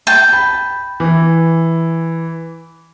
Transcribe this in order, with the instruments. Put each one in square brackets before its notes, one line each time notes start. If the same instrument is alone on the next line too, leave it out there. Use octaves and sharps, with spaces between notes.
[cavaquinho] G5 A5
[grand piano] B5
E3